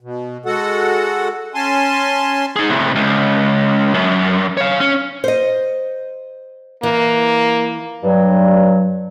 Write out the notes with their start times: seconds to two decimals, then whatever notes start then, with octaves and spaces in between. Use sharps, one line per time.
0.01 B2
0.46 G#3 F#4 A4 F#5
1.54 C#4 G#5 A5 C6
2.56 D#4 G#4
2.69 A2 C3
2.95 C#2
3.94 F#2
4.57 C#5 F5
4.81 C#4
5.24 C5 D#5
6.83 E3 A#3
8.03 G2 F#3